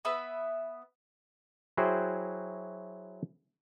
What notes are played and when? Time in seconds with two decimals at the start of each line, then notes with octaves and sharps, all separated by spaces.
0.05 B3 B4 E5 B5
1.77 F#3 E4 F#4 G#4 C5 G5